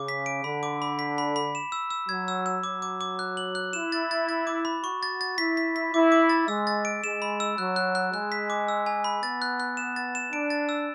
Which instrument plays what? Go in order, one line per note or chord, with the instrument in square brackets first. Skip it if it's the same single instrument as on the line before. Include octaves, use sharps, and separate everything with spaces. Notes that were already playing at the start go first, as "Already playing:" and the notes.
Already playing: [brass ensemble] C#3 [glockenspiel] D6
[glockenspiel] B6
D7
[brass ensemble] D3 [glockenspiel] B5
[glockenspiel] D6
B5
B6
B5
B5
E7
E6
E6
[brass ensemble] F#3 [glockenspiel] G#6
[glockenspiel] E6
E6
[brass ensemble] F#3 [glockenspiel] D6
[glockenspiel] D6
D6
F#6
F#7
F#6
[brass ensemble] E4 [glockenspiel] E7
[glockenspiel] A6
A6
A6
D6
B5
[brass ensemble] F#4 [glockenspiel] C#6
[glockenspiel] A6
A6
[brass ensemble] E4 [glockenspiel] B6
[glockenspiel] B6
B6
[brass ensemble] E4 [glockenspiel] D6
[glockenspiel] D6
A6
[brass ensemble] G#3 [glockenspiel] E6
[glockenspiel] A6
D7
[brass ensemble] G#3 [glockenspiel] E7
[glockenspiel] B5
E6
[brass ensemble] F#3 [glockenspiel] F#6
[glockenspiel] F#6
F#6
[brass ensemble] G#3 [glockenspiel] F#6
[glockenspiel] B6
D6
E6
G#5
B5
[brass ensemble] B3 [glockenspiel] A6
[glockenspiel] F#6
F#6
E7
A6
E7
[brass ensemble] D4 [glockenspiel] D7
[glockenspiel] A6
E6